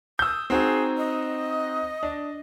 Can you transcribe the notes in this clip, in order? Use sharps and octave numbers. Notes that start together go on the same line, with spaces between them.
D#6 E6 G6
C4 D#4 F#4 G#4
D#5
D4